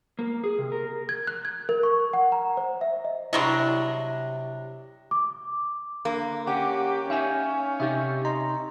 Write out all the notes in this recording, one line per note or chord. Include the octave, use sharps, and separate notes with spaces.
A#3
G#4
C3
A#4
G#6
F#6
G#6
A#4
C#6
F#5
A#5
C5
E5
D#5
C3 F#3 G3 D4 E4 D#5 A#5 C6
D6
D3 A#3
C#4 G4 F#5 D6
C#4 D#4 E5 F5 G#5
C3 D#4 G4 E5
D#5 A#5 C6